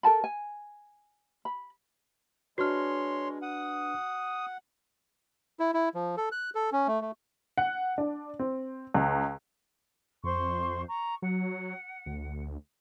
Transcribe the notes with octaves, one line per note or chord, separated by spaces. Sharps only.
A4 A#4 A5 B5
G#5
B5
G#3 D4 F#4 B4 C#5 C6 F6
F#5 D#6
E4
E4
F3
A4
F#6
A4
C#4
A3
A3
F#5
D4
C4
C#2
F2 C5 C6 C#6
A#5 C#6
F#3 F#5
D2